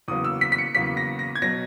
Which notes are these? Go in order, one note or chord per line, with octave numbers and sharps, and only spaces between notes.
E2 C#3 F#3 A#3 D#6
E6
B6
B6
C#7
E2 C#3 F#3 A#3 B6
A#6
A#6
G#6
B2 F#3 A#6